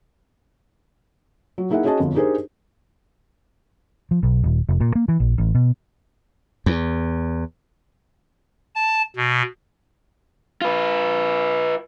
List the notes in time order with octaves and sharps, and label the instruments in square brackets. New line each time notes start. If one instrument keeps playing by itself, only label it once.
[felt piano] F#3
A#3 D#4 E4 G#4 E5 F#5
C#4 F#4 G#4 D#5 A5
G1 F2
D4 D#4 G4 G#4 A#4 C5
[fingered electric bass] F3
B1
D#1
F1
A#2
A#3
E3
A#1
A1
B2
[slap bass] E2
[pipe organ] A5
B2
[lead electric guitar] F4 B4